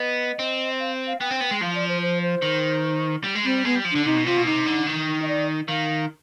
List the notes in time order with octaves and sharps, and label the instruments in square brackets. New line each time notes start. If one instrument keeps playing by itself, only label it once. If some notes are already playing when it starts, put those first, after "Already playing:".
Already playing: [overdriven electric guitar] B3 [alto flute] D#5
[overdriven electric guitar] C4
[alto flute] F5
F5
[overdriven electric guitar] B3 [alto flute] G5
[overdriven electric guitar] C4
B3
G#3
[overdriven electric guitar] F3 [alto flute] F5
[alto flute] D5
C5
C5
C5
[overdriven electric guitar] D#3
G3
G#3
[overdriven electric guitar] G3 [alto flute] C4
[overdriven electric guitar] G#3 [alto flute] B3
[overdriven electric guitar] G3
F3
[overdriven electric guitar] D3 [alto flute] D4
[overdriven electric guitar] C3 [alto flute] D#4
[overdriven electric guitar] B2
[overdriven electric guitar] C3 [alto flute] F4
[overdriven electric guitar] B2
[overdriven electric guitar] C3 [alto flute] D#4
[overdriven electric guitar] D3
D#3
[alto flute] D#4
D#5
D5
[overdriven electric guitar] D#3 [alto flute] F5